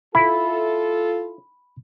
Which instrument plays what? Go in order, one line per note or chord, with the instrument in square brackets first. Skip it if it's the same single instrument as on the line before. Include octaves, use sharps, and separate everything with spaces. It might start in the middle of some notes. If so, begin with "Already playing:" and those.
[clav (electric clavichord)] E4 [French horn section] F4 A4 [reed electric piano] B5